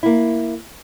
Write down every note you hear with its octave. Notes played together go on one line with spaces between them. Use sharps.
A#3 E4